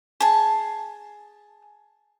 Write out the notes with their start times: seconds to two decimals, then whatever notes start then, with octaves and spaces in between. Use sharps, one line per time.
0.20 G#4 A5